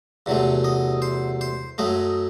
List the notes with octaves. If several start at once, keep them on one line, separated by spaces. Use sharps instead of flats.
E2 C3 F#3 A3
D#5
C5
C5
F#2 F#3 A3 D#5